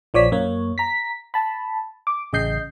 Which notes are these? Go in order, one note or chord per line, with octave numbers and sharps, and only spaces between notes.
A#1 F3 C#5 D5 B6
F#2 A#3 C#5
A#5 B6
A5 B5
D6
A1 C#3 D#5 G6 C7